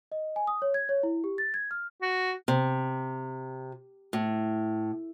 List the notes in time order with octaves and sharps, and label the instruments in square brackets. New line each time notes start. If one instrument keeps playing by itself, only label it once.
[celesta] D#5
G#5
D#6
C#5
G#6
C#5
E4
G4
A6
G#6
F6
[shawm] F#4
[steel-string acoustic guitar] C3
A2